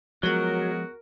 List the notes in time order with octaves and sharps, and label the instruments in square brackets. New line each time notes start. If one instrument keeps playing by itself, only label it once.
[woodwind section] C#2 B3 F#4 [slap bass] F3 G#3 [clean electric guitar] F#3 [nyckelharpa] A#4